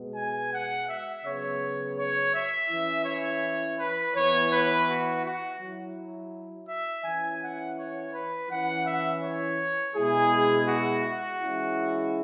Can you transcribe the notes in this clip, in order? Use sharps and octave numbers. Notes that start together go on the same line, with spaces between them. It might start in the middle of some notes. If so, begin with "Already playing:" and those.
Already playing: B2 G#3 B3
G#5
F#5
E5
C#3 F#3 B3 C#5
C#5
E5
E3 C#4 E4
C#5
B4
E3 B3 E4 C#5
B4
F#4
F#4
F#3 E4
E5
E3 C#4 E4 G#5
F#5
C#5
B4
E3 C#4 E4 F#5
E5
C#5
B2 G#3 E4 G#4
F#4
F#4
E3 G#3 C#4 E4